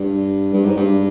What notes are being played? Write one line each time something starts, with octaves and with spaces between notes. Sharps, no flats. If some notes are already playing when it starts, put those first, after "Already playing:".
Already playing: G2
G2
G#2
G2